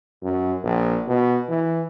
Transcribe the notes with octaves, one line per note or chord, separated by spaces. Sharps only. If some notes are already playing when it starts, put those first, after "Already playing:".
F#2
A#1
B2
E3